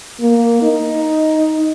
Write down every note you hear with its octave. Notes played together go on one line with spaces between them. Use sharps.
A#3
D#4